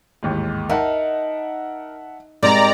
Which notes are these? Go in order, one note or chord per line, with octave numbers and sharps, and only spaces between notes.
A1 D#2 G#2
D#4 A#4 E5 F#5 A5
G#2 G3 A#3 C4 D#4 D5 A#5